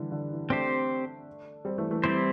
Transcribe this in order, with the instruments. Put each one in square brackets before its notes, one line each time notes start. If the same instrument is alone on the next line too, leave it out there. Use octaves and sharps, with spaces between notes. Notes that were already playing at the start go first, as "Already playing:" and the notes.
Already playing: [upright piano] D3 E3 G3
D3
E3
[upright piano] A3 D4 [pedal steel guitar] C4 G4 C5
[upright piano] G3 C4
E3 A3
E3 A3
[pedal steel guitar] G3 C4 E4 G4 C5